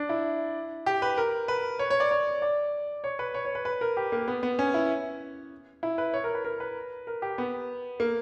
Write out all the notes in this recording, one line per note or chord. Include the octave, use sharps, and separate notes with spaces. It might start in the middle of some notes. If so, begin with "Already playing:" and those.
Already playing: D4
E4
G4
B4
A#4
B4
C#5
C#5
D5
C#5
D5
C#5
B4
C#5
C#5
B4
B4
A#4
G4
A#3
B3
B3
C#4
E4
E4
B4
C#5
A#4
B4
A#4
B4
A#4
G4
B3
A#3